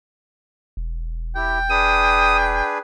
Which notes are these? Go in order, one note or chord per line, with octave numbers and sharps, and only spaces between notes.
E1
E4 G4 G5
D4 G#4 B4 D#6